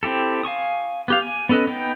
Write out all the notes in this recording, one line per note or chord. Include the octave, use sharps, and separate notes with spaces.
C4 E4 G4 A4
F5 G#5 C#6 D#6
B3 G4 F5
G#5
B3 C#4 A4 B4 D#5
B3 D#4 G5